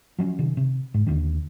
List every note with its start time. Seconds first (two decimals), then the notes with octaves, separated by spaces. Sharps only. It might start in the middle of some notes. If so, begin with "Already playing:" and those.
0.18 F3 F#3 A#3 C#4
0.39 C3 D#3
0.57 C3
0.94 G#2
1.06 D#2 B2 D3 D#3